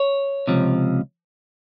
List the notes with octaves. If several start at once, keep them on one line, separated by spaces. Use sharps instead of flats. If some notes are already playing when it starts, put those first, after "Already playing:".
Already playing: C#5
C#2 C3 F3